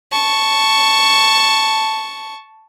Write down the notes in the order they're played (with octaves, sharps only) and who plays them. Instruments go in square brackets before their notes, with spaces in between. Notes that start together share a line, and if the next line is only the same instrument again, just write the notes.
[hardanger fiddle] A5 C#6